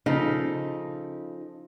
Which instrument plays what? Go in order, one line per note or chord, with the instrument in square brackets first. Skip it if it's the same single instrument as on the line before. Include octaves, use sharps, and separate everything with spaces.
[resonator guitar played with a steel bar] C#3 F3 A4 [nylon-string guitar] D#4